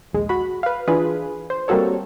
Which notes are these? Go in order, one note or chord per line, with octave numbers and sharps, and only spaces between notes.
A#1 D#2 G#3
F#4 B5
B4 F5
E3 D4 F4 G#4 B4
C5
G3 A#3 C4 F#4 A4 C#5